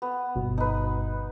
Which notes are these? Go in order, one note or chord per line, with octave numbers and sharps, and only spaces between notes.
B3
G1 B2
D#4 B4